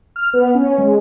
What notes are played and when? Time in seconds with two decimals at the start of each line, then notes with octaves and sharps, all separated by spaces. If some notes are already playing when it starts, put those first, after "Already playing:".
0.16 F6
0.33 B3
0.55 C#4
0.78 G#3